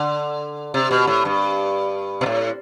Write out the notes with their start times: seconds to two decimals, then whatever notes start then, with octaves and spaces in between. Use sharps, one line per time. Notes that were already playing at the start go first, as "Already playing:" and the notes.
Already playing: D3
0.74 C3
0.91 B2
1.07 A2
1.25 G2
2.21 B2
2.26 A2